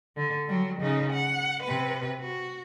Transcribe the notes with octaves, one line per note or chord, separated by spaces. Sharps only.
D3
F#3 G3
C#3 D#4
F#5
C3 B4
F#4